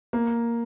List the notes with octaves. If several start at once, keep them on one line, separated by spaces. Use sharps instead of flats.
A#3